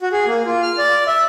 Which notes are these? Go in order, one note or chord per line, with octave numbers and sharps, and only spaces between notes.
F#4
G#4
A#3
F4
F6
D5
E5